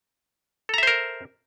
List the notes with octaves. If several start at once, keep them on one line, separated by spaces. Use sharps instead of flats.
A4 A#4 C5 E5 A#5